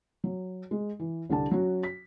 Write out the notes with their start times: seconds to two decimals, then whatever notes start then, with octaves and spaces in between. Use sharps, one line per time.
0.24 F#3
0.71 G#3
1.00 E3
1.30 C2 D3 D4 A5
1.51 F#3 C#4 F#4
1.83 B6